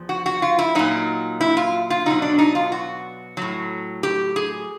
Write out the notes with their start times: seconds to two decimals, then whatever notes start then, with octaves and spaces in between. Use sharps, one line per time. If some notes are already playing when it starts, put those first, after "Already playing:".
Already playing: E2 F3
0.09 F#4
0.26 F#4
0.42 F4
0.59 E4
0.75 A#2 F#3 D#4
1.41 E4
1.57 F4
1.90 F4
2.06 B2 F#3 D#4
2.22 D4
2.38 D#4
2.55 F4
2.72 F#4
3.37 A2 F#3
4.03 G4
4.36 G#4